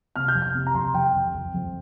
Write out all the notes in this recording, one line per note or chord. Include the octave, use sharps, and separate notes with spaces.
C3 F6
G6
F2
F6
C3
A#5
F2 C6
F2 G5
F2
F2
F2